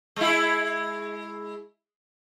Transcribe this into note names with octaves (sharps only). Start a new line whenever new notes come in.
G#3 E4